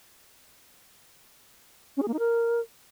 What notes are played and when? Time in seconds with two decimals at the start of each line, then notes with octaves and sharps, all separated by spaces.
1.97 C#4
2.02 G#4
2.08 A#3
2.13 D#4
2.19 A#4